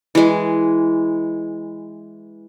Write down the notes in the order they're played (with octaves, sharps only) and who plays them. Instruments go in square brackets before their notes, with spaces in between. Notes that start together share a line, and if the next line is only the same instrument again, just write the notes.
[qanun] E3 G#3